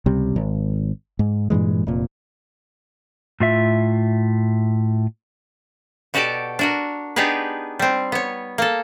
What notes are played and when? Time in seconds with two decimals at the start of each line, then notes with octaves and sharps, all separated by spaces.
0.06 C#2 C3 G3
0.36 G#1
1.19 G#2
1.50 G2 A#2 E3 G#3
1.87 F1 A#2
3.40 A2 F4 E5
6.14 B2 F#4 G4 A4 D5 A5
6.59 D4 F#4 A#4
7.16 B3 D4 D#4 G4 G#4 B4
7.79 G3 C4
8.12 B3 C#5
8.58 A#3 A4